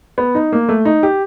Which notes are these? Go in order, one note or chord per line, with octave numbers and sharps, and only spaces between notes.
B3
D#4
A#3
A3
D#4
G4